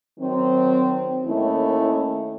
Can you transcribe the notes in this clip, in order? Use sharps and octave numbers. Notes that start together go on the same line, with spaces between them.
D#3 F#3 C4
D#2 D#3 A3 C#4 E4